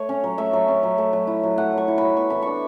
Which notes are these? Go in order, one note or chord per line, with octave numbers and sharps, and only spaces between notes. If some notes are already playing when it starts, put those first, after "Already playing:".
Already playing: A3 C#5
C#4
F#3
A3 E5
F#3
C#4
F#3
A3
F#3
E4
F#3
A3 F#5
F#3
C#6
E4
F#3 B5
B3 C#6
E3 B5
D4 C#6